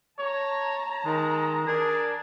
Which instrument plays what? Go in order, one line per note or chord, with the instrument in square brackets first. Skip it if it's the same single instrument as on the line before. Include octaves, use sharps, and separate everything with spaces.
[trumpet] C#5 [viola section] A5 A#5
[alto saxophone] D#3 [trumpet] G#3
[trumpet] D4 [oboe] G#4 [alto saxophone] A#4